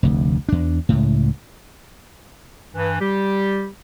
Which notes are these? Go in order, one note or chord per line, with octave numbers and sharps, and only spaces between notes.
F1 D2
E2 D4
C#2 A2
G2 E3
G3 G4